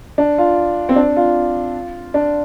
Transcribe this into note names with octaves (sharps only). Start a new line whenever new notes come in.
D4
F4
C4
D4
F4
D4